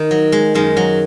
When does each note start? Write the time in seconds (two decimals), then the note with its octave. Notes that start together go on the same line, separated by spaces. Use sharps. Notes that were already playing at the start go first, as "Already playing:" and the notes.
Already playing: D#3
0.11 F#3
0.32 G#3
0.55 F#2 D#3 G#3
0.77 F#3